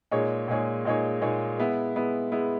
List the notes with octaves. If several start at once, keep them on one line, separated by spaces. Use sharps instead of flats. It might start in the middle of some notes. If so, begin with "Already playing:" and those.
A#2 G#3 D#4 G#4 C#5
A#2 G#3 D#4 G#4 C#5
A#2 G#3 D#4 G#4 C#5
A#2 G#3 D#4 G#4 C#5
G#3 B3 E4
G#3 B3 E4
G#3 B3 E4